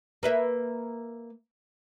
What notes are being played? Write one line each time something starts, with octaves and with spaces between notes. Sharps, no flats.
A#3 B4 E5